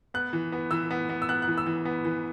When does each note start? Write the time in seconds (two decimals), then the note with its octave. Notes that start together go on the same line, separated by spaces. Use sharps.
0.14 B3 F#6
0.33 E3
0.52 B3
0.71 E3 E6
0.91 B3
1.09 B3
1.22 E6
1.29 B3 F#6
1.42 F#6
1.48 E3
1.58 E6
1.66 E3
1.85 B3
2.05 E3